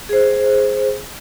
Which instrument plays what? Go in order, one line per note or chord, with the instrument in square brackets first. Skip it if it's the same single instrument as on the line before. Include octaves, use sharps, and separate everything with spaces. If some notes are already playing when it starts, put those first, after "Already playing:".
[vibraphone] G#4 C5